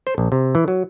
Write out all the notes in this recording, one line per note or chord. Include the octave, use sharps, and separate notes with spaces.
C5
A#1
C3
E3
F#3